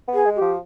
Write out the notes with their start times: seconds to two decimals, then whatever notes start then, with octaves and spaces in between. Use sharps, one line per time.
0.08 B3
0.14 G#4
0.26 G#3
0.36 G4
0.41 F3